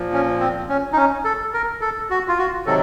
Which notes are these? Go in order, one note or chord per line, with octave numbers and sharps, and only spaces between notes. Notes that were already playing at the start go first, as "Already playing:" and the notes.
Already playing: A#2 F3
C#4
C4
C#4
D#4
C#4
A4
A#4
A4
F#4
F4
F#4
C3 D#3 F#3 A4